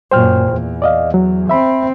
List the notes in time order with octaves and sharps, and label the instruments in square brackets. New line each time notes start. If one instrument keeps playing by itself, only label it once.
[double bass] F#2 A#2 [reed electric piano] C5 G5 F6
[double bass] E2
[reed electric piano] D5 D#5 F5
F#3
[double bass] C4 [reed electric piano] E5 B5